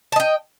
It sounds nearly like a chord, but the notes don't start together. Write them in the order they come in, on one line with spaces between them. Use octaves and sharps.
A5 D#5 G5